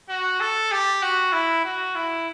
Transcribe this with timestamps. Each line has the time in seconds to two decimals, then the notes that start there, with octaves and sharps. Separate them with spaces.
0.09 F#4
0.40 A4
0.72 G4
1.03 F#4
1.33 E4
1.64 F#4
1.95 E4